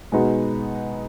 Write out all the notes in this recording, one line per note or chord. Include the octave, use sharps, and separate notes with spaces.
B2 G#3 B3 D#4 F#4